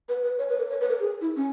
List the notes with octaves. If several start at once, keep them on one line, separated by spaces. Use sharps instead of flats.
B4
B4
C#5
B4
A#4
C#5
B4
A#4
G#4
E4
C#4